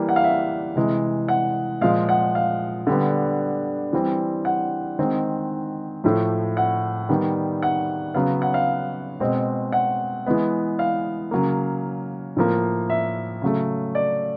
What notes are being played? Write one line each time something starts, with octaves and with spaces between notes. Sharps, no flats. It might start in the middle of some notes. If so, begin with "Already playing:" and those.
Already playing: E3 G3 A#3
F#5
F5
E5
C3 E3 G#3
F#5
A#2 F3 G#3 F5
F#5
F5
D3 G3 B3
E3 G3 C4
F#5
D#3 G#3 C4
A2 F3 A3
F#5
D#3 G3 B3
F#5
C#3 F#3 B3 F5
F#5
F5
B2 G#3 C4
F#5
E3 G#3 B3
F5
C#3 F#3 A#3
A2 F3 A#3
E5
C#3 F#3 A3
D5